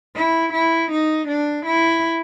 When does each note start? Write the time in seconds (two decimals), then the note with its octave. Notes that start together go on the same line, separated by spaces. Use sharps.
0.16 E4
0.54 E4
0.91 D#4
1.28 D4
1.66 E4